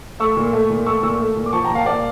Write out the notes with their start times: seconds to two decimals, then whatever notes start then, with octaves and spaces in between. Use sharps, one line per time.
0.20 A3 C#6 E6
0.37 A#2
0.53 A3
0.70 A#2
0.86 A3 C#6 E6
1.03 A#2 C#6 E6
1.20 A3
1.36 A#2
1.46 D6
1.53 F3 A5 C#6
1.64 G5 A#5
1.70 A#2
1.75 F5 A5
1.86 A#2 D5 F5